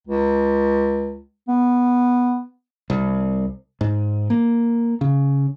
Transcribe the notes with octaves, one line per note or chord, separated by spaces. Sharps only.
C#2
B3
C2
G#2
A#3
C#3